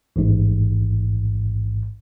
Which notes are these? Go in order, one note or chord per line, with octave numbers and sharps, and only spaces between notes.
A1 G#2